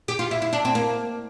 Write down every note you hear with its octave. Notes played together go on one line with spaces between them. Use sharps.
G4
F4
E4
E4
D4
C4
A#3